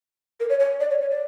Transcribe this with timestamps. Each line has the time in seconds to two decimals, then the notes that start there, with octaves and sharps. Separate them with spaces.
0.40 A#4
0.50 C#5
0.60 C#5
0.80 D5
0.91 C#5
1.01 C#5
1.11 D5